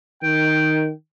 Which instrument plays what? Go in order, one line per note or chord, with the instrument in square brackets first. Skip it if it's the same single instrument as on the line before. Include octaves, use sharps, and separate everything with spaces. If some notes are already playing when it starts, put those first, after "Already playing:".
[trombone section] D#3 [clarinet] G5